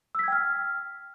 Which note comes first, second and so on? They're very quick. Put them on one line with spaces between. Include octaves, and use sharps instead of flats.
E6 B6 G#6 G5 F6